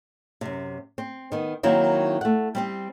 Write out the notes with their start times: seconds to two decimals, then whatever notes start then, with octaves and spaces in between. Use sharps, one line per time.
0.41 F#2 C3
0.98 C4
1.32 D#3 B3
1.63 D#3 F#3 A#3 C4 E4
2.21 A3 F#5
2.55 G3 C4 G4